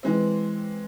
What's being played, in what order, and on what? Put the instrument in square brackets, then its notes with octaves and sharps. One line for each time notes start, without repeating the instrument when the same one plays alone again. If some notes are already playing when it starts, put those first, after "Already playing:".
[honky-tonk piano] E3 G#3 C4